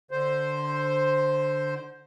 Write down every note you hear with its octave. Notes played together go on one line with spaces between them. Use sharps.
D3 C5